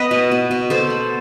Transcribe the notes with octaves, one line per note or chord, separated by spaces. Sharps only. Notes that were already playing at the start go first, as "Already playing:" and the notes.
Already playing: B3 B4 D#5
B2
B2
B2
B2 A4 C5
B3